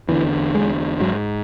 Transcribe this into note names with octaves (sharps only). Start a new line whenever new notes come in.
E2 D3 E3
G#3
G#2 F#3